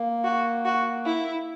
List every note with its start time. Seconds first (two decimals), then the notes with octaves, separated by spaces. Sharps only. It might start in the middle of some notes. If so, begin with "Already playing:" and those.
Already playing: A#3
0.24 F#4
0.65 F#4
1.05 E4